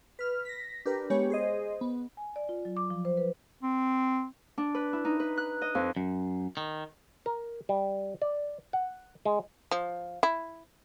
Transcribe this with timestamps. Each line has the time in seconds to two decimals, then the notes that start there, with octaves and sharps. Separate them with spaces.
0.19 B4 F6
0.45 A#6 B6
0.85 D4 G4 A#4 B4
1.10 G#3 B3 G4 C#5
1.30 G#4 C5 D#5
1.81 B3
2.17 G#5
2.36 D5
2.49 F4
2.65 F#3
2.77 D6
2.90 F3
3.05 C5
3.17 B4
3.63 C4
4.58 D4
4.75 B4
4.93 E4
5.05 D#4
5.20 B4
5.37 F#6
5.62 D#5
5.75 F2
5.96 F#2
6.57 D#3
7.26 A#4
7.69 G3
8.22 D5
8.73 F#5
9.25 G#3
9.71 F3
10.23 E4